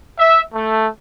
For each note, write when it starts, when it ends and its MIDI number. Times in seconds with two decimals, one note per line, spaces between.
0.19 0.42 76
0.54 0.89 57